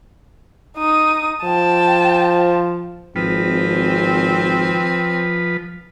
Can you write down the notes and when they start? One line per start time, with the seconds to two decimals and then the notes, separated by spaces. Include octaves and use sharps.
0.77 D#4 D#6
1.43 F3 G5 A5
3.16 G#1 F3 C4 B4